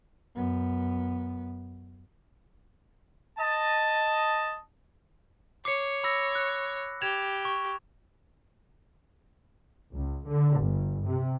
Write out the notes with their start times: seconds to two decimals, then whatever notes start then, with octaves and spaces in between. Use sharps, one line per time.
0.36 F#2 B3
3.39 D#5 A5
5.65 C#5 D6 C7 C#7
6.04 B5 E6 A#6
6.35 F#6
7.02 G4 G#6 E7 F7
7.45 C#6
9.94 C#2
10.27 D3
10.59 G1
11.06 C3